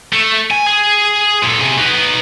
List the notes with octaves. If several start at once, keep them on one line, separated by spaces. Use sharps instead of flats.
A3
G#5
G#4
A#2 A4
C3 G#4
B3 D#4